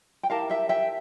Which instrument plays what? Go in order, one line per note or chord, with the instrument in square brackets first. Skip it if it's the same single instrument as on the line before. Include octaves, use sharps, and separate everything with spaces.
[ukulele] G5
E4 G4 A#4 F5 A5
E5 G5
E5 G5